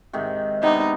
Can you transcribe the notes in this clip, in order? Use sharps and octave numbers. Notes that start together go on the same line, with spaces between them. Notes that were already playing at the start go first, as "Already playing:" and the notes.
G#2 C3 D#3
C3 B3 D4 D#4